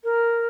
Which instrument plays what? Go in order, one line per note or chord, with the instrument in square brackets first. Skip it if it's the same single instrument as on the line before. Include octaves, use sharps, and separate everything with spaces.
[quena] A#4